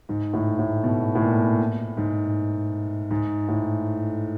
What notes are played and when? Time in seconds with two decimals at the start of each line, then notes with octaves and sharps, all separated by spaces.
0.09 G#2
0.33 A2
0.59 A2
0.84 B2
1.15 A2
1.21 A#2
1.97 G#2
3.11 G#2
3.48 A2